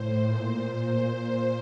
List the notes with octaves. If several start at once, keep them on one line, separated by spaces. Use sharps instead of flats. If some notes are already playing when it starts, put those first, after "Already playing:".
Already playing: A2 C5
A#2